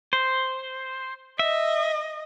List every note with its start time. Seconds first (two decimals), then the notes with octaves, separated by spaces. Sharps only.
0.13 C5
1.39 D#5 E5